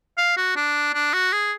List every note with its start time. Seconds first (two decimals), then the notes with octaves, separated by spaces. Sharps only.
0.18 F5
0.37 F#4
0.56 D4
0.94 D4
1.13 F#4
1.33 G#4